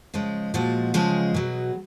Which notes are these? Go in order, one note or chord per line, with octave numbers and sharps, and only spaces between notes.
C#3 F3 G#3
A#2 F3 G#3 F#4
C#3 F3 G#3 G#4
B2 F#3